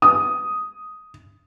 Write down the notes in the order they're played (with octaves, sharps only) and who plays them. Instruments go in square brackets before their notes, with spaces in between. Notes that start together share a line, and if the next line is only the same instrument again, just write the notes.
[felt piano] D#6